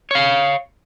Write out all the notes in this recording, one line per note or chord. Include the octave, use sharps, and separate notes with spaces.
C#5 F5